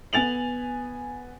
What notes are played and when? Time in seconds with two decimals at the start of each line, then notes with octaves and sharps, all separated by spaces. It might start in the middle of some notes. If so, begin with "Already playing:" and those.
0.13 B3 G#5 A6 F7 F#7